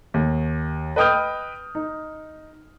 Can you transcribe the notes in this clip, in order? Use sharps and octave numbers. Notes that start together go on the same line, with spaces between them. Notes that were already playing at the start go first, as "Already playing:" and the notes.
D#2
B4 D#5 G5 D#6 F6 G6
D#4